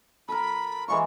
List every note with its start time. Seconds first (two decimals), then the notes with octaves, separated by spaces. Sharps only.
0.28 A4 A#4 B5
0.88 E3 G#3 F4 C#6